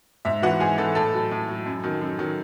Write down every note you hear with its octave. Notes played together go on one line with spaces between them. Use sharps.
G#2 E5
E3 F#4 F#5
G#2 G#4 G#5
E3 A4 A5
A2 A4 A5
F#3
A2
F#3
F#2
D#3 F#3
F#2
D#3 F#3